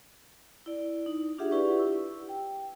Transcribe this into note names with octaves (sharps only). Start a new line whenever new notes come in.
E4 D5
D#4
D4 F4 G4 G#4 E5 F#5
E4 G4 B4 D5 C#6
E6
G5